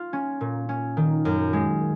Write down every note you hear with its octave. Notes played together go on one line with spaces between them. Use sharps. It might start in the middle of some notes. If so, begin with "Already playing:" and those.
Already playing: F4
C#4
A#2
C#4
D#3
F#2
G#3